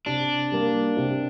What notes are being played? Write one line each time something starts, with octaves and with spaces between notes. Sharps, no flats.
C3 D4
G3 A#3
C3